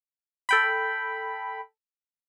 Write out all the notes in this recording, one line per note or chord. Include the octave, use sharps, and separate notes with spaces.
A4 G5 B5